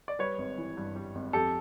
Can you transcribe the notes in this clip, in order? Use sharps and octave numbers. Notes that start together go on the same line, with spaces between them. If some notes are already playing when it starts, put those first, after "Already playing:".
D5
G3 B4 C#5
G#1
E3
G2
G3
G#1
F2 G4 A4